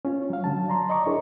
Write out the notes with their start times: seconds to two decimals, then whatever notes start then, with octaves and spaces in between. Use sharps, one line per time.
0.05 C#4 F4
0.30 F#3 F5
0.44 D3 F#3 A5
0.68 D5 A#5 C6
0.89 D5 D#5 A#5 C#6 D6
1.06 D4 E4 G#4 A#4 C#5